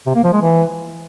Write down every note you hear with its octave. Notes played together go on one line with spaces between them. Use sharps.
C3
A#3
F3
G#3
E3